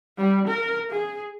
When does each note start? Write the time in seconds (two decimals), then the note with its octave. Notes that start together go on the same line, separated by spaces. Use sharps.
0.18 G3
0.48 A#4
0.91 G#4